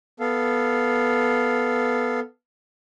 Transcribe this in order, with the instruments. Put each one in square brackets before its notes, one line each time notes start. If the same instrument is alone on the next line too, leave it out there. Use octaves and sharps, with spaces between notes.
[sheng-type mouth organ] B3 A4 F5